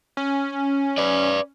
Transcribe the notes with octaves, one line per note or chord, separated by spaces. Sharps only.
C#4
B4 D5